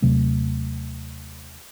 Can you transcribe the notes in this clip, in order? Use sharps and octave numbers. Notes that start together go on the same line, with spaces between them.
D#2 C3 F#3 A3